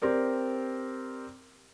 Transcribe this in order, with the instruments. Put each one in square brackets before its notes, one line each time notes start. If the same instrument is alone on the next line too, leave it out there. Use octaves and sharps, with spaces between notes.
[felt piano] C4 G4 A#4 D5